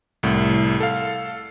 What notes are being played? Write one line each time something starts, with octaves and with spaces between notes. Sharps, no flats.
C2 A2
A4 F5